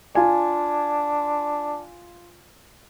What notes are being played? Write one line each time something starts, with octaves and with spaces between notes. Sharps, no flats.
D4 F4 G#5